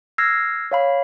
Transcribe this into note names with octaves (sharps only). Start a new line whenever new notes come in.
E6 F6 G#6 A#6 C7
C#5 F5 B5